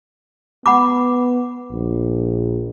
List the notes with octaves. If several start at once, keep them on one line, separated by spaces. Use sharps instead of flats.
B3 F#5 B5 D6
A#1